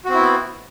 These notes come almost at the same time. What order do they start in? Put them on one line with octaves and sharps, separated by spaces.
F#4 C4 E4 B3